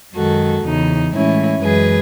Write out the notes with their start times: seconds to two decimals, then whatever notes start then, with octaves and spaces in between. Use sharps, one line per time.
0.15 F#2 D#3 G#3 F#4 A4
0.65 E2 C#3 E3 D#4
1.13 A2 E3 G#3 C#4 E4
1.62 F#2 E3 G#3 G#4 B4